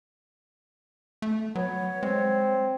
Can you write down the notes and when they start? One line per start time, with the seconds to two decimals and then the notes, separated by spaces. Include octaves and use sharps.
1.22 A3
1.55 F#3 B3 C#5
2.03 G#3 C4